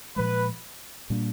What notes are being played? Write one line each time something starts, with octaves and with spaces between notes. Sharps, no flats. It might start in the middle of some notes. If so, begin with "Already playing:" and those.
A#2 F3 G#3 B4
A#2 G3 A#3 D4